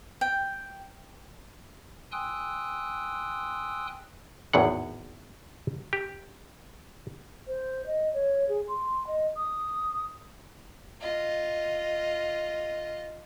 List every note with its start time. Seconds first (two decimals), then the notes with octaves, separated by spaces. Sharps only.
0.21 G5
2.12 G5 G#5 C6 D#6 E6 F#6
4.53 G#1 E2 A2 F#5
5.93 G4
7.47 C5
7.86 D#5
8.13 C#5
8.48 G#4
8.68 C6
9.06 D#5
9.36 D#6
11.01 F4 D#5